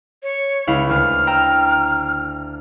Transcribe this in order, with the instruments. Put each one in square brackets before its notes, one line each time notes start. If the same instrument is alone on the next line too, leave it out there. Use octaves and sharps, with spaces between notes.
[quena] C#5
[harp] C#2 E4 F5
[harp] D2 [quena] F6
[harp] G5 A#5 E6